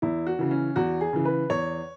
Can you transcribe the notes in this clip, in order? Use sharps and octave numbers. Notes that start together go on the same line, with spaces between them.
E2 E4
F#4
C#3 E3
C#4
E2 F#4
G#4
C#3 E3
B4
E2 C#5